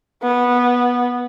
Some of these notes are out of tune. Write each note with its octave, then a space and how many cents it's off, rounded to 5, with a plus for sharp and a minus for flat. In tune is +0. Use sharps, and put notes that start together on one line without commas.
B3 -15